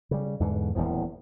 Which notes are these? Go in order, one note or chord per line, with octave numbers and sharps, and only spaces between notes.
C#3 G3
E2 G#2 D3 E3
D#1 E2 A2 F3